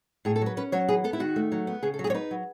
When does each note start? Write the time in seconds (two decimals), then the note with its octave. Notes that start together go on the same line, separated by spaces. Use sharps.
0.25 A2 G#4
0.36 A4
0.41 F#3 B4
0.57 C#4 B4
0.72 F#3 C#5
0.88 E3 G#4
1.04 B3 A4
1.13 E4
1.20 D#3 F#4
1.36 A3
1.52 F#3
1.67 B3
1.83 C#3 G#4
1.94 A4
1.99 F#3
2.04 G#4
2.10 C#5
2.14 D#4 B4
2.31 F#3